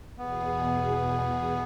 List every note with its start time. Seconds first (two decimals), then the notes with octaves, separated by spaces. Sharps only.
0.18 E2 B2 B3 G#4